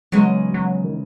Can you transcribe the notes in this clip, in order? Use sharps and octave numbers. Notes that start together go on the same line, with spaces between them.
E2 C#3 F#3 G#3
F#3
D#3